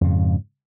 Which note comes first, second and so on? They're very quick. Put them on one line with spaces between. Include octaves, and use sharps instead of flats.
F2 C#3 G#2